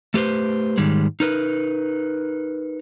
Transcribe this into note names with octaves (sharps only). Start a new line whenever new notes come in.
A3 G4 B4 C5
G#2 D#3 G3 G#3
D#4 A#4 B4